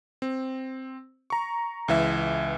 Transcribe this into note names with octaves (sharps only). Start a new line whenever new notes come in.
C4
A#5 C#6
C#2 E3 E5